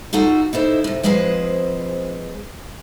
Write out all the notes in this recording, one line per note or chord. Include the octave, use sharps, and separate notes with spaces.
D#4 F4 F#4 A4
D#4 E4 A4 C5
A2 C3
F3 G#3 C4 G#4 B4 C5